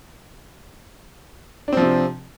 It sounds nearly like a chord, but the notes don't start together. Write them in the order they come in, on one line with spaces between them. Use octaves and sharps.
D4 C4 F3 C3